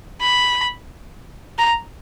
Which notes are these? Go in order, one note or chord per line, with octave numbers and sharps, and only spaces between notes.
B5
A#5